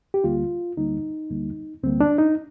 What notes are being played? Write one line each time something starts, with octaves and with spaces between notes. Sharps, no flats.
G4
D2 D3 G3 A#3 F4
D2 D3 G3 A#3 D#4
D2 D3 G3 A#3
D2 D3 G3 A#3 C4
D4
D#4